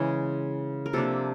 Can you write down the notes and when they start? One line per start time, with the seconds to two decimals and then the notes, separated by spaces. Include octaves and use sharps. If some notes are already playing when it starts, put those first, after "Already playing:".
Already playing: C#3 E3 G#3
0.86 A#4
0.93 C3 F3 A#3 D4 A4